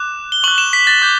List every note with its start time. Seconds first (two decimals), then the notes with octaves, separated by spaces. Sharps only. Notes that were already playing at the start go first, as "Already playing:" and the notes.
Already playing: D6 F#6 E7
0.32 G7
0.44 C#6 F#6 F#7
0.58 E7
0.73 B6
0.87 A6
1.02 D6 G6